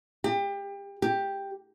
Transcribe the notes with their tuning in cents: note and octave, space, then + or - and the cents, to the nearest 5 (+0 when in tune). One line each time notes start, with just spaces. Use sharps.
G4 +30
G4 +5